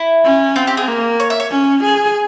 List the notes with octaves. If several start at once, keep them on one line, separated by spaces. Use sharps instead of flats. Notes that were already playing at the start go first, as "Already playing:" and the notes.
Already playing: E4
C#4
C4 F4
G4
G#4
A#3
C#5
E5
C#5
C#4
G#4